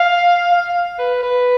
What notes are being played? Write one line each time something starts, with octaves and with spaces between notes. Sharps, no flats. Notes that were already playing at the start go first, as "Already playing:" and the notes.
Already playing: F5
F5
B4
B4